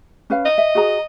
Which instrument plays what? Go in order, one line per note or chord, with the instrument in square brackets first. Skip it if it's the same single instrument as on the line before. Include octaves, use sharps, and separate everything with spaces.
[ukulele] C#4 B4 F5
[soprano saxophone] D#5
[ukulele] E5
F#4 G#4 A#5